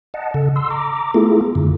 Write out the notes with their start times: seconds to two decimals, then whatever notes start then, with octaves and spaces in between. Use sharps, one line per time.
0.14 D#5 F#5 A5
0.34 C#3 A4
0.56 C6 E6
0.70 A#5 D6
1.14 A3 B3 E4 F4 G#4 A4
1.55 F#2 D3